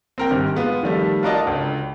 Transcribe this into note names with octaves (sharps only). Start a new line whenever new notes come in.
C4 A#4 G5
G#1 G2
G#3 B3 F4
D#3 F3 G3 A3
F4 F#4 A#4 D5 D#5 A5
C#2 D3